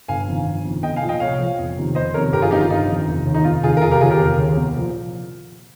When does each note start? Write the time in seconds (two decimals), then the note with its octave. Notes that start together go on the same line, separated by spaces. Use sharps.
0.08 G1 F5 G#5
0.27 F2 D#3
0.46 G1
0.65 F2 D#3
0.83 C2 D#5 G5
0.96 F5 G#5
1.02 A#2 F3
1.09 D#5 G5
1.20 C2 C#5 F5
1.39 A#2 F3
1.58 F1
1.77 F2 C3 D#3
1.95 F1 C5 D#5
2.14 F2 C3 D#3 A#4 C#5
2.32 G1 G4 A#4
2.42 F4 G#4
2.51 F2 D#4 G4
2.56 D#3 F4
2.70 G1 D#4
2.89 F2 D#3
3.08 F1
3.26 D#2 D#3
3.34 D#4
3.44 F1 F4
3.63 D#2 D#3 F4 G#4
3.77 A#4
3.82 F1 F4 G#4
3.91 G4 A#4
4.01 D#2 C#3 F4 G#4
4.10 G4 A#4
4.20 F1
4.38 D#2 C#3
4.57 C2
4.75 A#2 F3